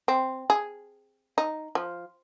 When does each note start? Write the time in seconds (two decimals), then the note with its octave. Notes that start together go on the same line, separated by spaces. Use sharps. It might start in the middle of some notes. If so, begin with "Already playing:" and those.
0.08 C4
0.50 G#4
1.38 D#4
1.75 F3